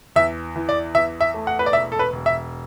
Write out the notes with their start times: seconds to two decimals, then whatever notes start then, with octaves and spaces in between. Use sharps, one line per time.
0.16 E2 E5
0.56 E3
0.69 D5
0.95 E2 E5
1.21 E5
1.34 A3
1.47 F#5
1.59 B4
1.66 D5
1.73 E1 E5
1.92 A4
1.99 B4
2.13 E1
2.26 E5